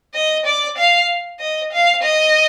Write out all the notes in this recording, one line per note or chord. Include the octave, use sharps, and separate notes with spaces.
D#5
D5
F5
D#5
F5
D#5